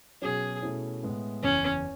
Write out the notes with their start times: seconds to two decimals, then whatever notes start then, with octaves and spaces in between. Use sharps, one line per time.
0.22 B2 F#3 C#4 G#4
0.62 B2 A3 C#4 E4
1.03 A2 G#3 B3 E4
1.42 F#1 E2 C#3 C#4